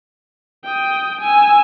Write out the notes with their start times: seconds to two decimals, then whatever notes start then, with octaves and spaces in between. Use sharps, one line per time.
0.65 G5 D#6
1.21 G#5 E6